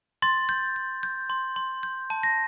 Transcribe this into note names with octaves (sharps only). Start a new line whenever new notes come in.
C6 A6
G6
G6
G6
C6
C6
G6
A5
A#6